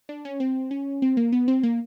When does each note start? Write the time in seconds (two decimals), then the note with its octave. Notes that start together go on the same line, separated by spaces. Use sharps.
0.09 D4
0.25 C#4
0.40 C4
0.71 C#4
1.02 C4
1.17 A#3
1.33 B3
1.48 C4
1.63 A#3